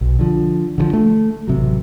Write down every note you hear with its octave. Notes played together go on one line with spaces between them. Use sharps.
B1
D3 F3
D3 E3 F3
A3
A1 C3 F#3